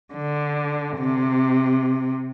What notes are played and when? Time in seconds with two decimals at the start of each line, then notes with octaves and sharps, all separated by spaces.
0.14 D3
0.98 C3